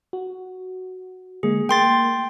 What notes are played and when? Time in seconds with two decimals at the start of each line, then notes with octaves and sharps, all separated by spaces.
0.13 F#4
1.43 D3 G#3 A#3 G#4
1.69 A3 A#3 A#4 G5 C6 A6